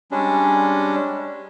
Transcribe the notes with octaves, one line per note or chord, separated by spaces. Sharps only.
G3 G#3 C#4 D4